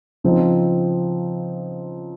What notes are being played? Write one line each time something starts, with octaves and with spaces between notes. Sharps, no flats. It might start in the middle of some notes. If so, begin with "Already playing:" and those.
C#3 F3 C4 D#4